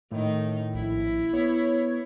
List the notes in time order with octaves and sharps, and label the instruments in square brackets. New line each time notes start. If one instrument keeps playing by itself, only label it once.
[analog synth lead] A2 [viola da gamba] D#3 D#4
[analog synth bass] A#1 [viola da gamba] E4
[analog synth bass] B3 [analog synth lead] C#5